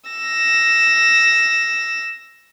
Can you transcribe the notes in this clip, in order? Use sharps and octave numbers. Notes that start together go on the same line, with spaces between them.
E6 A#6